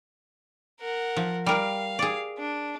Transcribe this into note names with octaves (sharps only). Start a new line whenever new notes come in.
A#4 F#5
F3
G3 A#4 F5
G#4 D5
D4